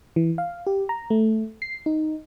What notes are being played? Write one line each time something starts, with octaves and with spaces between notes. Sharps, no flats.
E3
F5
G4
A#5
A3
C7
D#4